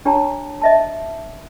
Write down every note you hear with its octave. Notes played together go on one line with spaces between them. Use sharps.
D4 G4 C#5 A5 A#5
D#5 E5 A5